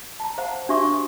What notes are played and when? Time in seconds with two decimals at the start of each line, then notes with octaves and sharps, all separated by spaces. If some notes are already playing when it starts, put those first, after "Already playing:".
0.20 A5 A#5
0.38 C5 F5 F#5 A#5
0.69 D4 F#4 G4 E5 C#6 D#6